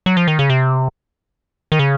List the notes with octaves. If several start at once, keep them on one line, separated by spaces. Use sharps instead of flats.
F#3
F3
D#3
C#3
C3
D#3
C#3